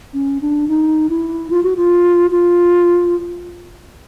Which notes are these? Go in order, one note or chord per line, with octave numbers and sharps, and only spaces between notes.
C#4
D4
D#4
E4
F4
F#4
F4
F4